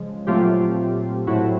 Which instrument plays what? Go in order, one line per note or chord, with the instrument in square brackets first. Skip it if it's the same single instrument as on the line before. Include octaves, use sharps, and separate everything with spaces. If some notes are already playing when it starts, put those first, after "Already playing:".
Already playing: [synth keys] C#3 F3 G#3
A#2 F#3 A3 C4 F4 G4
A2 F#3 A3 C4 E4 F#4